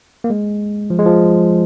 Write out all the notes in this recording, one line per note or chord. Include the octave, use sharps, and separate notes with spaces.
A#3
G#3
F3
G#3
F3